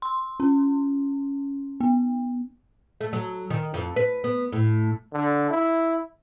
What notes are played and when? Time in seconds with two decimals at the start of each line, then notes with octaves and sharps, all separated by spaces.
0.02 C6
0.40 C#4
1.81 B3
3.01 A3
3.13 F#3
3.50 D#3
3.74 F2
3.96 B4
4.24 B3
4.52 A2
5.12 D3
5.50 E4